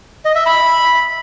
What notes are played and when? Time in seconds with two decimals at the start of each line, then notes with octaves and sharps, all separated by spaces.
0.25 D#5
0.35 E5
0.46 B5